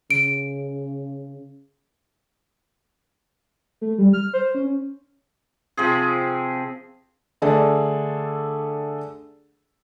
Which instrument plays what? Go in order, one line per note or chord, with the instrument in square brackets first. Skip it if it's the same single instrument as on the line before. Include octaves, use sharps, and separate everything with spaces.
[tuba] C#3 [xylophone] D7
[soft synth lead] A3
G3
F6
C5
C#4
[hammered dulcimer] C3 F3 C4 G#4
[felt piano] D3 A3 D4 G#4 A4